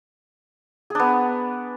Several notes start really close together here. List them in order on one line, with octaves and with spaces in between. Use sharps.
G#4 D4 B3